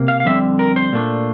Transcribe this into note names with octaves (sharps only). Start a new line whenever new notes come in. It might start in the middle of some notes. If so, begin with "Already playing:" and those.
Already playing: C3 A#3
F5
F5
F2 D3 G3 C4 E5
A#4
C5
A#2 A3 D4